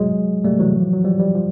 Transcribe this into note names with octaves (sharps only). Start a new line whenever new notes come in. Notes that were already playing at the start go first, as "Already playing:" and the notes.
Already playing: F#3 G#3
G3 A3
E3 F#3
F3
F#3
F3 G3
F3 G3
F3 G3